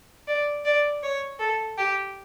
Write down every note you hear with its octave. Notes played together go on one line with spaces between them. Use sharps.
D5
D5
C#5
A4
G4